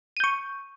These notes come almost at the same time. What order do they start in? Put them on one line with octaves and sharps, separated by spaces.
D#7 G6 C#6